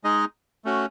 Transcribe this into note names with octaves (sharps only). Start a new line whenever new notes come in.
G#3 D#4 G#4 D#5
A3 C#4 F#4